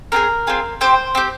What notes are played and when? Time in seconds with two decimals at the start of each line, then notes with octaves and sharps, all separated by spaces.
0.12 C4 F4 G#4 A#4
0.47 C4 F4 G#4
0.81 C4 G4 C5
1.15 C4 G4